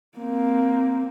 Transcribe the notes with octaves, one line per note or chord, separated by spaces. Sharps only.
A#3 C4